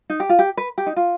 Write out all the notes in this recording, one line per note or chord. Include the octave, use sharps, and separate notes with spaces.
D#4
G4
F4
G4
B4
G4
D#4
F4